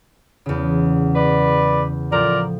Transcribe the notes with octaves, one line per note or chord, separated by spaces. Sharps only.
E2 C#3
B4 D5
A2 F3 F4 A#4 D5